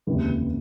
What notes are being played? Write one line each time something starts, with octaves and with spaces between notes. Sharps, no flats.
F1 D#2 C#3 E3 G#3